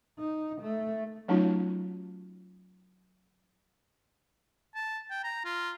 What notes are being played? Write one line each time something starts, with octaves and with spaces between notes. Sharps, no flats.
D#4
A3
F#3 A3 C#4 D#4 F4 F#4
A5
G5
A#5
F4